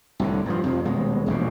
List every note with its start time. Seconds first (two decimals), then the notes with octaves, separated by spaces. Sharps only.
0.20 C2 A2 D3
0.46 G2 F3
0.64 F2 C3 F3
0.85 D#1 B2 G#3
1.26 E1 A#1 E2 B2